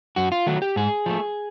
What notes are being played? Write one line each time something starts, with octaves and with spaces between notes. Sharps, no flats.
F#2 F#4
F4
D#3 F#3 A3 F#4
G4
G#2 G#4
F3 A3